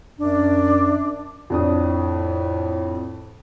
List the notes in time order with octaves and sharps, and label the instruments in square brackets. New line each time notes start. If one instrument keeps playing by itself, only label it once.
[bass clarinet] F#2 [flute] D4
[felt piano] F2 D4 D#6 [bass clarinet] A2